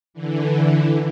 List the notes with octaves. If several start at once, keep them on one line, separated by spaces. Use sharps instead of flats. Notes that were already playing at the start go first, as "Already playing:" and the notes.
D3 E3